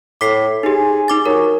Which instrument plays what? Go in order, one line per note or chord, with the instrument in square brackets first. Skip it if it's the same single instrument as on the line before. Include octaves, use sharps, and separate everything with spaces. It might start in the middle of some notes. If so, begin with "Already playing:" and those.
[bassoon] A2 [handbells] D6 B6 C7
[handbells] D#4 G4 [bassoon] G#4
[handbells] D#4 D6 A6
[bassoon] F#3 [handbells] A#4